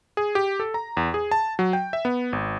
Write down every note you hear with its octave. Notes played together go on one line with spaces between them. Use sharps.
G#4
G4
A4
A#5
E2
G#4
A5
F#3
G5
E5
B3
G#1